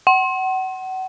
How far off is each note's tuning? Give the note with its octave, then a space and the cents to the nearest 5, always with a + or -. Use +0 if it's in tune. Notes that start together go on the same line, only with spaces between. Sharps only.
F#5 +30